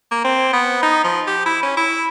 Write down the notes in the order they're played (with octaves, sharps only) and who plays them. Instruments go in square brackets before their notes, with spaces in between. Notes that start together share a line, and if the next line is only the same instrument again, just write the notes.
[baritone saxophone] A#3
C4
B3
D#4
F3
G4
E4
C#4
E4